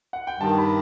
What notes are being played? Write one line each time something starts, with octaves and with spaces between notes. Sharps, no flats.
F#5
G5
G2 D#3 G3 A5
B5